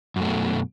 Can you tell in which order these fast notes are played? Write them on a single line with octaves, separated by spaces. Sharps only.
F#2 A3 B2